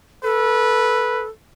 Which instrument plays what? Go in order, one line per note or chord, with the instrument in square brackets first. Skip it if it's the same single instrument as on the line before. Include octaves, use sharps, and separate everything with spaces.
[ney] A4 [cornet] B4